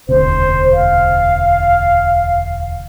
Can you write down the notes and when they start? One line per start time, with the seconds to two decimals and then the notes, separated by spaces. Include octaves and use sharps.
0.09 E1 D2 C3 C5
0.73 F5